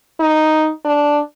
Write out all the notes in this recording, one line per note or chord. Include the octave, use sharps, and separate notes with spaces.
D#4
D4